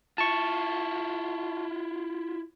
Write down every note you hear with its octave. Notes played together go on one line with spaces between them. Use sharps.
E4 F4 A5 C#6